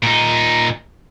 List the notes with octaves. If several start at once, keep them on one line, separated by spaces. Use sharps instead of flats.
A#2 D#4